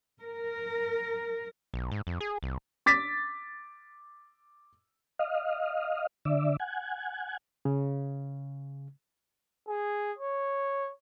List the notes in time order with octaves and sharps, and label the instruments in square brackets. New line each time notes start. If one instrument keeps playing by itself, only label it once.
[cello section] A#4
[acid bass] B1
G#2
F2
G#4
C2
[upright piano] D6 A6 B6
[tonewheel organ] D#5 F5
D3 D5 E5
F#5 G#5
[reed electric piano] C#3
[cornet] G#4
C#5